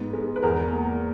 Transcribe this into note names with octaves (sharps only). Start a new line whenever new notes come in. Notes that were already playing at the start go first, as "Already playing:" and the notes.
Already playing: G#2 B3
G#3
B4
E2 A#4
A#3